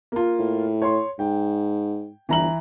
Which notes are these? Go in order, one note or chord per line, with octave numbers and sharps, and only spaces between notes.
A#3 F4
A2
C#5 C6
G#2 G5
G1 E3 A#5 F#7